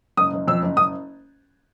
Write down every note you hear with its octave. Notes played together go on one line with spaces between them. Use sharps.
F#1 D#6
F#1
F2 E6
F#1
F#1 D#6